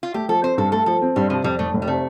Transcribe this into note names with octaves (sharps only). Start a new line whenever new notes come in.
F4
A3 G4
F3 A4
C4 C5
G2 A4
A3 A4
F3 A4
C4
G2 G3
C3 F3
F2 G3
F1 A3
F1
G3
C3 A3